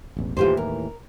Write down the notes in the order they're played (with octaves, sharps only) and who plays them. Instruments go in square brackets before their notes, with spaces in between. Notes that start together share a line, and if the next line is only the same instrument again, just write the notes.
[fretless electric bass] E1 A1 E2
[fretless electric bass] D#2 A2 E3 [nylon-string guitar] F4 G4 C5
[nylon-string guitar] A#4